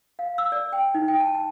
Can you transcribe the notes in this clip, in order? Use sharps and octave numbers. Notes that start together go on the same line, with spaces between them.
F5
E6
D5
G5
D#4
G5
A5
A5